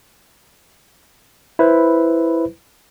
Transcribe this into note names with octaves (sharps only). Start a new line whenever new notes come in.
E4 B4 C5